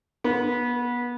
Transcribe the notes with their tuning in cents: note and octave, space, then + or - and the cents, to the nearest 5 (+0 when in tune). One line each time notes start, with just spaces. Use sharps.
B3 -25